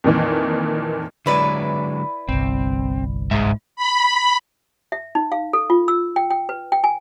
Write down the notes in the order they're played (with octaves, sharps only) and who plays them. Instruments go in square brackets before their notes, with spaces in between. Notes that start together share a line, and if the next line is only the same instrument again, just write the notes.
[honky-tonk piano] F2 A#2 D#3 E3
[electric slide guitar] D3 F#3 G#3 [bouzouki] E4 B4 D5
[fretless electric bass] G1 C2 [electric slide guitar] C4
[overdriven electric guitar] G#2 [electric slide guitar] G#4 E5
[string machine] B5
[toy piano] E5
D#4
F5
A4
F4
E6
G5
G5
B4
G5
G#5